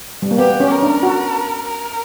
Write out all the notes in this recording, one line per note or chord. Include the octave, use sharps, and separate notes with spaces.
G3
A#3
B3 G4
C#4
A#4
D4
F#4
A#4